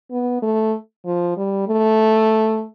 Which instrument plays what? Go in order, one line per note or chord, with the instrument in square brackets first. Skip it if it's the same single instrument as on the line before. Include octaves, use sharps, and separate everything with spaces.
[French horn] B3
A3
F3
G3
A3